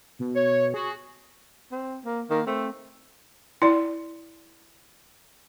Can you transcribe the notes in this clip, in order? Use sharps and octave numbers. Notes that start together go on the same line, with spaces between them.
B2
C#5
F#4 G#4
C4
A#3
D#3 A#3
A3 C4
E4 D5